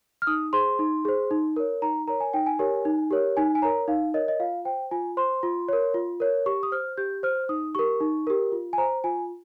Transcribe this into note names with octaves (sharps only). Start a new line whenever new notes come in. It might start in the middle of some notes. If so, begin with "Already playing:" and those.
F6
D#4 D#6
G#4 C5 C6
D#4
G#4 C5
D#4
A#4 C#5
D#4 A#5
A#4 C#5 A#5
G#5
D#4 G5
G#5
G4 A#4 C#5
D#4
G4 A#4 C#5
D#4 G#5
G#5
A#4 C#5 A#5
D#4 F5
A#4 C#5 D#5
D#5
F4 F5
C5 G5
F4 G#5
C5 C6
F4
A#4 C#5
F4
A#4 C#5
G4 C#6
D#6
C5 F6
G4 G6
C5 F6
D#4 D#6
G4 A#4 C#6
D#4
G4 A#4
F4
G#5
C5 A#5
F4 G#5